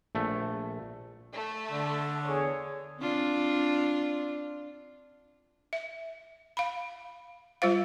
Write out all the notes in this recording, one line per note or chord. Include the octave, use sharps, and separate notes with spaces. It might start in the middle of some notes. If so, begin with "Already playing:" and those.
A#1 A3
A3
D3
E2 G#4 C#5
C4 D4 F4
E5
F5 B5
G3 F4 C5 F5